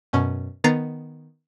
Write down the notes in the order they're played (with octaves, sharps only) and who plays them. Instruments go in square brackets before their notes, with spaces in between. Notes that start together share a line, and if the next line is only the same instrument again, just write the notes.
[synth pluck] F#2 B2 C#4
D#3 B3 A#5 A6 C7